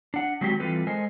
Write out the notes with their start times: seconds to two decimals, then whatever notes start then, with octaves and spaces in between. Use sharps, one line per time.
0.14 D4 F#5
0.41 D#3 F#3 G#3 C4 F#4 G4
0.60 E3 G3 C4 F4 A4 B4
0.87 G#3 A4 A#4 C5 D#5 G#5